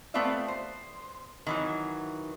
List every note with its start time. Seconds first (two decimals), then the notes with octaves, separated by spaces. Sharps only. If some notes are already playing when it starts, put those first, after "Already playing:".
0.14 A3 B3 C4 F4 D5 E5
0.48 C5
1.47 D#3 E3 F#3